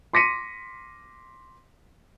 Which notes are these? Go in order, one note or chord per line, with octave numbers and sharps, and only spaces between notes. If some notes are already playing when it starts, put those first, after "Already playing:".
C6 D6 A#6 B6 C#7 D#7